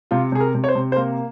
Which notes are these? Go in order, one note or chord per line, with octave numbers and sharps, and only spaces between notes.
C3 F4
C3 G#4
A#4
C3
C#5
C5
C3
C5
A#3 A#4